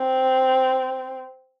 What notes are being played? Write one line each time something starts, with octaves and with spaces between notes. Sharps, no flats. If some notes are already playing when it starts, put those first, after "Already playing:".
Already playing: C4